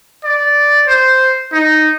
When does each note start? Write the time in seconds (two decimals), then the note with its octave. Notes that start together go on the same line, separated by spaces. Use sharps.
0.24 D5
0.87 C5
1.52 D#4